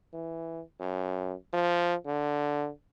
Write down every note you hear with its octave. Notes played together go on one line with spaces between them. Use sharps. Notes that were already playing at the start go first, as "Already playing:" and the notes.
E3
F#2
F3
D3